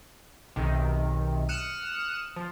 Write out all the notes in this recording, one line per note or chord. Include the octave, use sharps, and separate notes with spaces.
B1 C3 D#3
D#6 F6 F#6 C#7 E7
F3